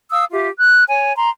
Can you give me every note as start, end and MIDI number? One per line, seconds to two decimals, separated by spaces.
0.11 0.24 77
0.11 0.24 87
0.11 0.24 88
0.31 0.48 65
0.31 0.48 67
0.31 0.48 76
0.57 0.84 90
0.88 1.15 73
0.88 1.15 80
1.16 1.29 82
1.16 1.29 84